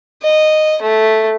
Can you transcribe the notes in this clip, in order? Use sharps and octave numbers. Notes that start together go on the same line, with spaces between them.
D#5
A3